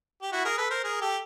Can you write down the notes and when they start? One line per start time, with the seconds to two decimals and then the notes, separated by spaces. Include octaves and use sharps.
0.22 G4
0.32 E4 F#4
0.45 G#4 A#4
0.58 A4 B4
0.70 A#4 C5
0.84 G#4 A#4
1.01 G4 A4